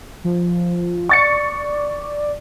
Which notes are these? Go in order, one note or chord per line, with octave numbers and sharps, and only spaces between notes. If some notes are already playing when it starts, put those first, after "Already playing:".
F3
D5 C#6 A6 C#7